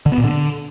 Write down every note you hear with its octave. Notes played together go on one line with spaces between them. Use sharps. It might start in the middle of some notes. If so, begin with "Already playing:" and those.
D3
B3
A#2
D3